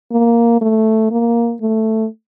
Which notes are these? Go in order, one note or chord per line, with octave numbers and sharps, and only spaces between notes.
A#3
A3
A#3
A3